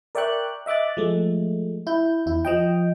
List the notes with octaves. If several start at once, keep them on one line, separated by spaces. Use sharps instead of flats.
A#4 D5 E5 G5 C#6 F#6
D#5 E5 D6 F#6 A6
F3 G#3 A3
E4 G6
E2 E4
F3 D#5 G5